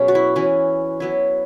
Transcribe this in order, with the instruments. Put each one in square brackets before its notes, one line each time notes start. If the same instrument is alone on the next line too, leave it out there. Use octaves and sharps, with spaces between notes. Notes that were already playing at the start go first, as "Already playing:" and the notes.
Already playing: [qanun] B2 F#3 C#4 G#4
F#4
E4
E3 C#4 E4
F#3 B3 E4